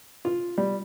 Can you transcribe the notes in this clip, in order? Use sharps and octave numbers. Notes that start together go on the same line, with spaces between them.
F4
G3